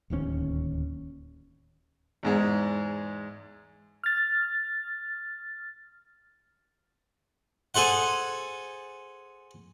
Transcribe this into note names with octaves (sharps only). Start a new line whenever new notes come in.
D1 D#2 D#3 C#4
E2 G#2 G#3
F6 A6
G#4 A4 C5 F#5